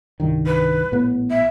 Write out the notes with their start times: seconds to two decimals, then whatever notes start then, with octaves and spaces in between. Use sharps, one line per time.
0.20 C2 G2 D#3
0.46 B4
0.91 A#1 A2 B3
1.30 E5